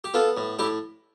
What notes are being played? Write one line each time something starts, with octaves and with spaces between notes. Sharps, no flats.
G4
B3 F4 A4
A2
A2 E4 G4